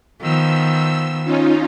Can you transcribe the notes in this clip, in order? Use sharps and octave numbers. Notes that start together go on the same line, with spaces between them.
D#3 F3 B3 E6
C#4 D#4 F4